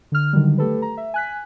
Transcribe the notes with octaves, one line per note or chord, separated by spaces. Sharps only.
D3 F6
D3 D#3 F#3 G3
A3 G4 A4 B4
A#5
E5
G#5 F#6 B6